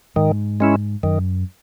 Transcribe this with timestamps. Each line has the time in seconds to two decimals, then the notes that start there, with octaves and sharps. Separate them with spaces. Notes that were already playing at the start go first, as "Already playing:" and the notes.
0.16 G#2 D#3
0.60 G#3 C#4 E4
1.03 F#2 D#3